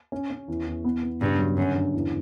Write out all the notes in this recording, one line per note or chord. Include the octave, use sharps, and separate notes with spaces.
C#4
C#4
E2
E2
B3
B3
G2 C#3
F#3
F#2 D3
D3
E2